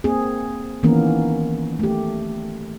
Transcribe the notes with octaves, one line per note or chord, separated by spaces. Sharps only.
A#3 C4 G#4
D#3 E3 A#3 B3 C#4 A#4
A3 G4